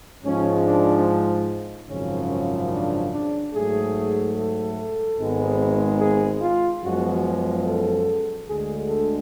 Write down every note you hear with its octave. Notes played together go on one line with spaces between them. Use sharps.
G#2 F3 G#3 C#4
D4
G#1 F#2 C#3 F3 C#4
C#4
D4
D4
G#2 F#3 A3 G#4
A4
G#1 G#2 G#3 B3
G#4
F4
F#2 F3 G#3 B3 F#4
A4
D2 D3 G#3 G#4
A4